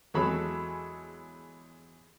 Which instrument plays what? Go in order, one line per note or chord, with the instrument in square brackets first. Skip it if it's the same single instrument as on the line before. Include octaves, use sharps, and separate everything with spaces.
[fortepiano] E2 F#3 G#3 A4 C#5 B5